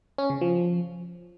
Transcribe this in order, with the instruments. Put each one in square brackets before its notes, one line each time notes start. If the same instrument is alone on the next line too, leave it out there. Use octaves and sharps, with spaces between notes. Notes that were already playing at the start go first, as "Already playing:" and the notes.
[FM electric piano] C#4
C#3
F3